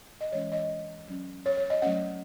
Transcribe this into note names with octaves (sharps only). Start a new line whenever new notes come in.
D#5
E3 G#3 C#4 C#5
D#5
F#3 C#4
C#5
C#5
D#5
F#3 A3 C#4 F#5